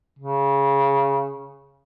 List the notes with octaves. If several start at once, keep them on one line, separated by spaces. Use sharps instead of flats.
C#3